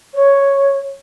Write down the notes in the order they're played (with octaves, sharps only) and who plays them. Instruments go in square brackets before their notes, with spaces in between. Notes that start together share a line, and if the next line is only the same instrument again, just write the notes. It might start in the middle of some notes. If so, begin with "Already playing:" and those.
[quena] C#5